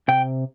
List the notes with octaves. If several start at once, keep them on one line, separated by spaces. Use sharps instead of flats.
C3 G5